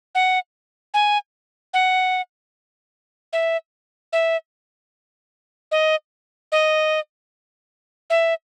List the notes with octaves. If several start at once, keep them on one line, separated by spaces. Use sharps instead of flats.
F#5
G#5
F#5
E5
E5
D#5
D#5
E5